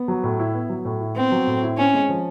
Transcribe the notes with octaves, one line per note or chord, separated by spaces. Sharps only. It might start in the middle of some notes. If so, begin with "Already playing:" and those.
Already playing: B3
F#3
A2
E4
B3
F#3
A2
E4
B3 C4
F#3
A2
E4
C4 C#4
G#3
F3